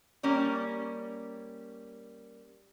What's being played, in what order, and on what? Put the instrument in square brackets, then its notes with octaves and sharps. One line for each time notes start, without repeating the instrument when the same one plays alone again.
[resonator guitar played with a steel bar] G3 A#3 C#4